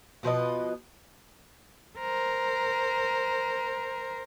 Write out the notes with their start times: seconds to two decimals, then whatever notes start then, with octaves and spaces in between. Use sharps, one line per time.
0.23 B2 F3 B4 D#5
1.99 A#4 C5